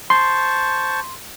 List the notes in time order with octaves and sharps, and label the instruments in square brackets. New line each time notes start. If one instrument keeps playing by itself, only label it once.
[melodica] C5 A5 C#6 [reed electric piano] C6